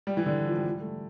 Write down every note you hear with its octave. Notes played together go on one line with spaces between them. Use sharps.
G3
E3
D3
F3
G3
G3
A3